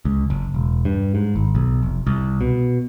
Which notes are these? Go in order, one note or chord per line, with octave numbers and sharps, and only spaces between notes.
C#2
F#1
E1
G2
G#2
G#1
B1
F1
C2
B2